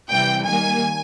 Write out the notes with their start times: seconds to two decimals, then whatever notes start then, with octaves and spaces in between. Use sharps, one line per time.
0.10 C3 E3 G3 G5
0.48 D#3 G3 A#3 G#5